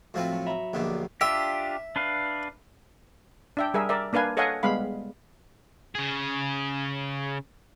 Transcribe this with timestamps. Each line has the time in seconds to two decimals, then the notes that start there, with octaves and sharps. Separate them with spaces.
0.14 A2 F3 C4 F#4 B4
0.32 F#3
0.46 E5 A#5 B5
0.73 A#1 D#2 B2 D3
1.21 D4 F4 G4 E5
1.96 D4 B4 F5
3.57 D4 E5 G5
3.74 G3 G#4 A#4 E5
3.89 A#4 D5 E5
4.13 A#3 D4 B4 F5 G#5
4.37 A4 C#5 D#5 F5 F#5 G#5
4.63 G3 G#3 B3 F5 B5
5.95 C#3 G#4